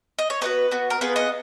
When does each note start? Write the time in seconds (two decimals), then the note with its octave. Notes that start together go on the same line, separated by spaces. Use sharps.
0.19 D#5
0.30 C#5
0.41 B3 D#4 F#4 B4
0.71 B3 F#4
0.90 A#4
1.01 B3 F4 G#4 B4
1.16 D#5 F#5